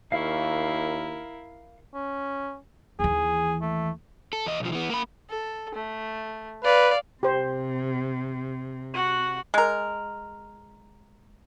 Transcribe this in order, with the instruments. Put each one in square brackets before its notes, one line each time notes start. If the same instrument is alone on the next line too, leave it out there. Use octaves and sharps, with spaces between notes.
[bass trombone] D#2 [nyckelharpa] E4 A#4 [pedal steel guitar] F5 C#6
[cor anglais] C#4
[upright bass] D#2 E3 [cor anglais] G#4
[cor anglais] A3
[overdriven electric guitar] A4
E2 D#5
B1 F3
E3 B3
A#3 B5
[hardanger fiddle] A4
A3
[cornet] B4 [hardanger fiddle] D5 F5
[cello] C3 [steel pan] G4 C5
[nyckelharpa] F#4 F#5
[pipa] G#3 A#4